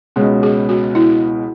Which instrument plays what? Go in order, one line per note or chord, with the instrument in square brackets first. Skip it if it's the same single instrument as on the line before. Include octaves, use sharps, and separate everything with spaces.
[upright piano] C#2 B2 G#3 C#4 [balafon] F#4
[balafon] G#4
F#4
E4